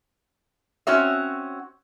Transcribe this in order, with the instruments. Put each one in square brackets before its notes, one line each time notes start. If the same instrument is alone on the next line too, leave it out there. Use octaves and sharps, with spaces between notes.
[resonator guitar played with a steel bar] C4 C#4 F#4 C#5 E5